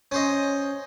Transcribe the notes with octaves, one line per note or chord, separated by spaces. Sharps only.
C#4 C5 D#5